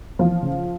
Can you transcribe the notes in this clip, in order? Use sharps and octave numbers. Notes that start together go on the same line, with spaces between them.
E3 F3 F4
C#3